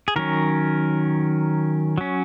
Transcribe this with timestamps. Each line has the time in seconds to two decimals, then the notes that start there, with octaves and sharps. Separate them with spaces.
0.08 G#4
0.16 D#3 F#3 C#4 A#4
1.98 F#3 C#4